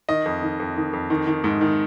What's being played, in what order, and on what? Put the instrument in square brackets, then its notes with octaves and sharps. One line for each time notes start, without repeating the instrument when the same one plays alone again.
[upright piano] D#3 D#5
F2
D#3
F2
D#3
F2
D#3
D#3
G#2
D#3